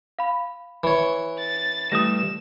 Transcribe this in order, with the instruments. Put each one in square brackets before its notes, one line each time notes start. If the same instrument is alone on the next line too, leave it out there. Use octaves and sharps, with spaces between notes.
[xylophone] F5 B5
[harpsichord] E3 C#5
[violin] A6
[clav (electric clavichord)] E3 G3 A3 [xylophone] D#6 A#6 [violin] E7